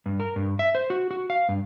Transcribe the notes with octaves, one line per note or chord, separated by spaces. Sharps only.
G2
A#4
G2
E5
C5
F#4
F#4
F5
G2